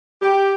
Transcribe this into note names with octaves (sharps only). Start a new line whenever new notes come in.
G4